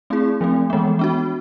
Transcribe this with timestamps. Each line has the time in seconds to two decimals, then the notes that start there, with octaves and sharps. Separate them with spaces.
0.10 A3 C4 E4 G#4
0.41 F3 A3 C4
0.70 E3 G#3 B3
0.99 B3 D4 F#4